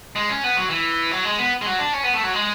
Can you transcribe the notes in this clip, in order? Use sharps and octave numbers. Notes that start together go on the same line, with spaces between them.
G#3
C#4
B3
F#3
E3
F#3
G#3
B3
G#3
F#3
D4
C#4
B3
A3
F#3
G#3